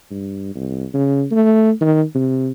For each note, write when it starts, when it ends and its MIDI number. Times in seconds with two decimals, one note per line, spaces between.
0.11 0.51 43
0.55 0.85 36
0.94 1.25 49
1.31 1.72 57
1.81 2.02 51
2.15 2.51 48